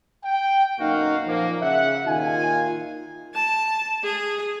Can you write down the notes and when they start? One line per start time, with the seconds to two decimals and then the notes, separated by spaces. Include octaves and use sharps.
0.24 G5
0.80 B1 F#2 A#3 D#4 F#4 F5
1.27 A#2 F3 A#3
1.62 C#3 E5 F#5
2.06 D#2 A#2 D#3 F4 G#5
3.34 A5
4.03 G#4